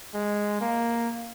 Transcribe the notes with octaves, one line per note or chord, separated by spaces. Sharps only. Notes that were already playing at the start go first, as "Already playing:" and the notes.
G#3
A#3